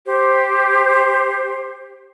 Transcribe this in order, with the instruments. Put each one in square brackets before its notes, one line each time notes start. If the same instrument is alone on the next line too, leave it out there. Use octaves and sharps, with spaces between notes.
[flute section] G4 C5